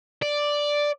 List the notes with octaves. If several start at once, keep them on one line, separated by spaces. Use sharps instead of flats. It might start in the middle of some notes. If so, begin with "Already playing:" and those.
D5